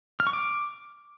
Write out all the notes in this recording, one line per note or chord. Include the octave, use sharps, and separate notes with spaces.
F6
C#6
D6